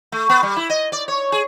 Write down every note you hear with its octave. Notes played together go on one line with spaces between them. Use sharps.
A3
B3
G3
E4
D#5
D5
C#5
G#4